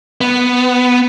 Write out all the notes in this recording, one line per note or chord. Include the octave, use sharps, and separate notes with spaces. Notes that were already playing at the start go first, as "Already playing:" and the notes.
B3